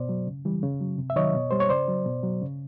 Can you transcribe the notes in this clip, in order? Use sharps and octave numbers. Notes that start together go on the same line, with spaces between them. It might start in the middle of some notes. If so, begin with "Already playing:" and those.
Already playing: B2 C5 D5
F#3
C#3
E3 G3
C#3
F#3
C3
E5
D#3 F#3 C#5 D#5
B2
G3 C5
C#5
C#3 C5 D5
F#3
B2
F#3
C#3